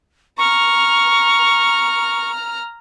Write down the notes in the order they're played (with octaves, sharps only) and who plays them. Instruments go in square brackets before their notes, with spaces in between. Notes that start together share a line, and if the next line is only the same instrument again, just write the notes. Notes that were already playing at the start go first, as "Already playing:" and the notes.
[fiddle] A#5 F6 [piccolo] C#6